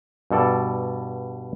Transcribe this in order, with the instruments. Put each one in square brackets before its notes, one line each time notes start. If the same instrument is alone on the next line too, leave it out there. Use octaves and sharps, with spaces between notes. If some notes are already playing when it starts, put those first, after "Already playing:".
[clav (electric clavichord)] G2 B2 A4 D5